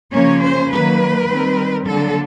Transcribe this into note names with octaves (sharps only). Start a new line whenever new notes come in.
C#3 F3 A#3 C#4 C#5
C5
D#3 F#3 A#3 B4
D#3 G3 C4
D3 F#3 A#3 A4